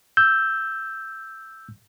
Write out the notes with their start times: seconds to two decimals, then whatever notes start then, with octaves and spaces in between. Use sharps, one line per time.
0.17 E6 G6